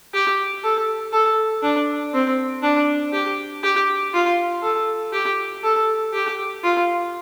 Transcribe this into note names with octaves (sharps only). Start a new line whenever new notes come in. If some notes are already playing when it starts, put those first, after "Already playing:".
G4
A4
A4
D4
C4
D4
G4
G4
F4
A4
G4
A4
G4
F4